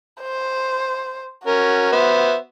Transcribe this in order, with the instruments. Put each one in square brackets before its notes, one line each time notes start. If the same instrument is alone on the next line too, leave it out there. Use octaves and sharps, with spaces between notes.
[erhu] C5
[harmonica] C#4 A#4 [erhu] F#4
[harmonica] B3 C5 E5